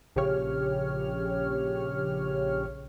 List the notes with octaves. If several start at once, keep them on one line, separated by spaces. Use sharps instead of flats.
A#1 C#3 G4 C#5 F6